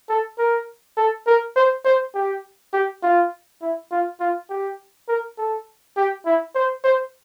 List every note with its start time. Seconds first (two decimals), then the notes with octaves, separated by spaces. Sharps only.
0.09 A4
0.39 A#4
0.97 A4
1.27 A#4
1.56 C5
1.85 C5
2.14 G4
2.73 G4
3.03 F4
3.62 E4
3.91 F4
4.20 F4
4.50 G4
5.08 A#4
5.38 A4
5.97 G4
6.26 E4
6.55 C5
6.84 C5